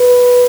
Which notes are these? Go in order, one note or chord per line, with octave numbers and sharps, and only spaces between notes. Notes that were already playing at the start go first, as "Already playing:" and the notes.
Already playing: B4